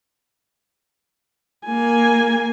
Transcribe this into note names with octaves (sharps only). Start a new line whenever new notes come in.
A#3 G#5